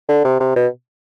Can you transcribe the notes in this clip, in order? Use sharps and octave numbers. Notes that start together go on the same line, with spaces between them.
D3
C3
C3
B2